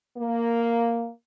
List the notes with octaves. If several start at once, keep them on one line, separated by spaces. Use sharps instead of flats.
A#3